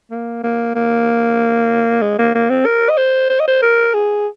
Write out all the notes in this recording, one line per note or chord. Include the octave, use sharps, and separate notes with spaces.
A#3
A#3
A#3
G#3
A#3
A#3
C4
A#4
D#5
C5
C5
D#5
C5
A#4
G#4